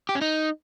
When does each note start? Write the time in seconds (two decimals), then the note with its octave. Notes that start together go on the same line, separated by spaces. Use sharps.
0.09 G4
0.15 C#4
0.21 D#4